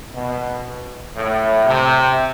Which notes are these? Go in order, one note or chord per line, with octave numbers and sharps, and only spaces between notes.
B2
A2
C3